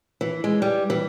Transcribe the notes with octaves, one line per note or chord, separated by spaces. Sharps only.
E3
G#3
G3
E3